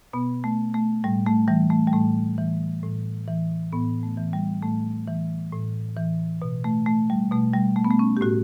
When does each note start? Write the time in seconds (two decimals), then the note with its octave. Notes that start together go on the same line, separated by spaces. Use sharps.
0.13 B2 B3
0.44 A3
0.74 A3
1.04 A2 G3
1.26 A3
1.48 E3 G3
1.70 A3
1.87 G3
1.93 A2 A3
2.38 E3
2.83 A2
3.28 E3
3.73 A2 B3
4.03 A3
4.17 E3
4.33 G3
4.62 A2 A3
5.07 E3
5.52 A2
5.97 E3
6.42 B2
6.64 A3
6.86 A3
7.10 G3
7.31 B2 A3
7.54 G3
7.76 A3
7.85 B3
7.91 A3
7.99 C#4
8.17 G4
8.21 A2 F#4